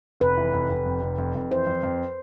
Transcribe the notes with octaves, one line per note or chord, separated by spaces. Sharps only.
F1 B4
E3
F1
F1
F2
F1
F2
F2
E3 C5
F2
F2